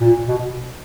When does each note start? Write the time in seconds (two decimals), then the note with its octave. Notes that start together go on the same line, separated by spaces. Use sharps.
0.01 A#2
0.28 B2